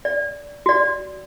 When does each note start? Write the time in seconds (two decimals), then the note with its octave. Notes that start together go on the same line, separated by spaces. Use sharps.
0.05 D5
0.66 F#4 D5